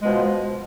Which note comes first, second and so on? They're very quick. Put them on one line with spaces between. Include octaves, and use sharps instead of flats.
G#3 B2 F3